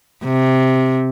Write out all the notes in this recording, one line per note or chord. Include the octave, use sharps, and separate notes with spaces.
C3